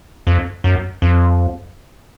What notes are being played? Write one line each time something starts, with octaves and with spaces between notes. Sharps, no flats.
F2
F#2
F2